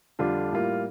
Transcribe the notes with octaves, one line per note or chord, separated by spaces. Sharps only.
F2 D3 G3 D4 F4
A2 G3 A#3 F4